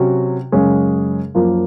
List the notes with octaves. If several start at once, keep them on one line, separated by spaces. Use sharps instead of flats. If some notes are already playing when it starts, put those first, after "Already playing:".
Already playing: C3 F#3 C#4 F#4
F#2 C#3 G#3 C#4 G#4
F#2 F3 A#3 F4